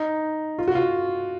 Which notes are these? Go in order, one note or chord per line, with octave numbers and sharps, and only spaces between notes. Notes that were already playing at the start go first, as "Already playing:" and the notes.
Already playing: D#4
F4
F#4
F4